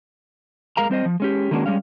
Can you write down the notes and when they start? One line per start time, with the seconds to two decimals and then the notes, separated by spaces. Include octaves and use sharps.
0.77 G#2 G#3 A#4 F5 A#5
0.90 G3 C4 C5 D#5
1.06 F3
1.20 G#3 C#4 G4
1.51 D#3 G#3 A#3 C#4 D4 F#4
1.66 G3 G#3 C#4 F5